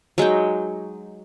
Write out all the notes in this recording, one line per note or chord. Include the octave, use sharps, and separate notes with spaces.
F#3 G#3 D#4 G5